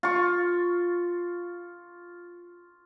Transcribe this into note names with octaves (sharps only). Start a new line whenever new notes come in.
F4 C#6